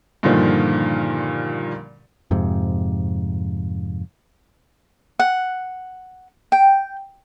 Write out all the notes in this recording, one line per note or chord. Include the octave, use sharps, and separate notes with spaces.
G2 A#2 D3 D#3 F3
F2 G#2 C3
F#5
G5